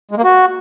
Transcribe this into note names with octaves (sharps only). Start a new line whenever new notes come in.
G#3
A#3
F#4